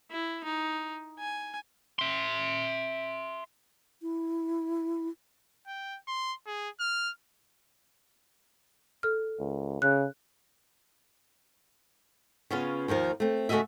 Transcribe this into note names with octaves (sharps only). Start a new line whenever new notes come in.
E4
D#4
G#5
E5 C6
E4
G5
C6
G#4
F6
A4 F6
C#2
C#3 F#6
C#3 B3 C#4 F4
D#2 D#3 F3 A#4
A3 C4
C#3 A3 A#3 F#4 D#5 E5